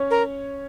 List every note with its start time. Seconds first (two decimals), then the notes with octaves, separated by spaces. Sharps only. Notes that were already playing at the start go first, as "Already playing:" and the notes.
Already playing: C#4 C#5
0.11 A#4